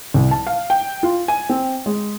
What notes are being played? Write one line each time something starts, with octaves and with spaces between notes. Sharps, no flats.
C2
A5
F5
G5
F4
G#5
C4
G#3